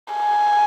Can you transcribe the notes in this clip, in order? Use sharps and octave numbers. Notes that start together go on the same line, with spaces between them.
G#5